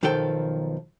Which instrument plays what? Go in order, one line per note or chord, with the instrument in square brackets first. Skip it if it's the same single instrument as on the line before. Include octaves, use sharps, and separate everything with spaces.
[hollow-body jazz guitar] B1 D#3 F3 A4 G5